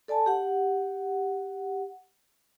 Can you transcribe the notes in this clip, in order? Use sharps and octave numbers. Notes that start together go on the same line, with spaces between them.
A4 D5 G#5 A5
G4 F#5